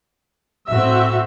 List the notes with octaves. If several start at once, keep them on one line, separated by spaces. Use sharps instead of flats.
A2 C4 F#4 E5